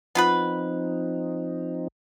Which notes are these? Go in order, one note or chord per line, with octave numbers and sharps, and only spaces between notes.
F3 B3 C4 D#4 F4 B4